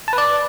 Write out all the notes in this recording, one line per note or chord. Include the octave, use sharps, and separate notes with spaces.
A5
B4
D5